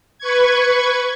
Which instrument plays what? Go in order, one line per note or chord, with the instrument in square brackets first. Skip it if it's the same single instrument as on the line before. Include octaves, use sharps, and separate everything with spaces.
[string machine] B4 C#6 G#6